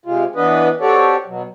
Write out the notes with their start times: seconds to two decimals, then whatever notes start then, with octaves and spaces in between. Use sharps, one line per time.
0.06 C3 G#3 F4
0.36 E3 B3 D4 B4 D#5
0.81 C4 F#4 G4 A4 C#5 D5
1.27 B2 F#3